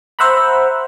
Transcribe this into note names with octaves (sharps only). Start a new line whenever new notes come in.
C5 E5 F#5 A#5 B5